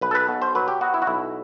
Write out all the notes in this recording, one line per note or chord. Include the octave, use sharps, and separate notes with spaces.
B1 B4
A4
B4
B2
C5
F#3 B4
G4
B3 F#4
E4
F#4
B1 E4